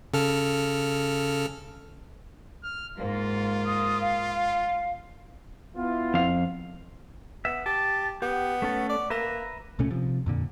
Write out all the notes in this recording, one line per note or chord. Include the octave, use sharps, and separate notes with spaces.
C#3 A4 F6
F6
G#2 A#3 F4
D#6
F5
F5
B3 E4 F4
F2 F5
B3 E5
G4 A5
B3 G4
A3 C#4 A4
D5
A#3 B4 E5 A#5
C2 A#2 A3 C#4
C3 F3
F2 A#2 D3